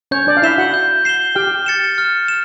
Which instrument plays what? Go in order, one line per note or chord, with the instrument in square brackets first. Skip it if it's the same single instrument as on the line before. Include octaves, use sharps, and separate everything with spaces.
[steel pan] C#4 C#5 [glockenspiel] G6
[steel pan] D4 D5
F5
[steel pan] E4 E5 [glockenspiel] C7 E7 G7
[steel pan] F#4 F#5
[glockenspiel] G6
C7 E7 G7
[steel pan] G4 G5 [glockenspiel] F6
[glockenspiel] A6 C#7 E7
F6
E7